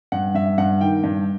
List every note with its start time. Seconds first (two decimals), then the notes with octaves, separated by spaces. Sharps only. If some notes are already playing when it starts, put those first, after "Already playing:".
0.12 G2 F#5
0.35 G2 E5
0.58 G2 F#5
0.81 D#3 G5
1.04 G2